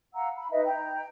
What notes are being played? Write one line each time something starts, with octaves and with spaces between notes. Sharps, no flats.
F5 F#5 A#5 E6
B5
D#4 B4 D#5 E5
G5 A#5